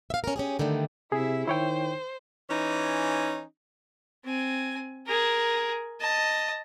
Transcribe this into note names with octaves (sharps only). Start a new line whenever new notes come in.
E5 F5
C#4 A#4
C#4 G4 G#4
G#2 D3 D#3 G3 A3
C3 E4 G#4 E5
D#3 E4 C5 C#5 G5
E3 C#4 D#4
C4 G#5
G#4 A#4
D#5 A5